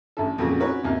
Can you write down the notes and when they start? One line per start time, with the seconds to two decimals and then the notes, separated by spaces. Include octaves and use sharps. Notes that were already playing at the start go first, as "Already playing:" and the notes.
0.17 A1 D3 A4
0.38 F2 A#2 C#3 F#4 G#4
0.59 C4 C#4 D#4 F#4 B4 C#5
0.83 D#2 C3